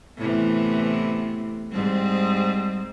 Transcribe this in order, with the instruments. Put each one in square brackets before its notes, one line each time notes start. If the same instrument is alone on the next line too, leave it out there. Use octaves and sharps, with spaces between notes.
[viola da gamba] A2 C3 E3 [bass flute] B3
[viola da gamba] G#2 C4 [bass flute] G3